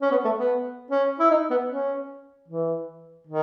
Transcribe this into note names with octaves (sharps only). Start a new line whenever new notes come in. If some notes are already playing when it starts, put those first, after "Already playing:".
C#4
B3
A3
B3
C#4
E4
D#4
B3
C#4
E3
D#3